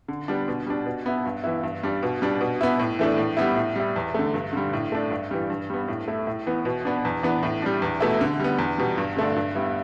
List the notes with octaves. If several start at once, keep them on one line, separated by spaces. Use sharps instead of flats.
D3
G3 B3 D4
B2
G3 D4
B2
B3 E4
G2
E3 B3 E4
G2
G3 D4
B2
G3 D4
B2
B3 E4
A2
E3 A3 D4
A2
G3 B3 E4
A2
G3 E4
E2
D3 A3
G2
D3 G3
A2
A3 D4
G2
E3 G3
G2
G3 B3
A2
A3 E4
A2
E3 B3
B2
B3 D4
E2
E3 B3 D4
A2
G3 D4
E2
B2 A3 E4
D3
G3 B3
E2
B2 G3
G2
D3 A3 D4
G2
G3 B3 E4